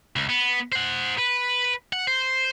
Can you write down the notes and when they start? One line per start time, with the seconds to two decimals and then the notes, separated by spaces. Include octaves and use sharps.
0.16 C#2
0.29 B3
0.72 C5 F#5
1.18 B4
1.93 F#5
2.07 C5